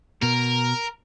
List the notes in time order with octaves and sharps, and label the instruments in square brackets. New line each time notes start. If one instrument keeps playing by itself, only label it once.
[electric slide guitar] B2 [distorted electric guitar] A#4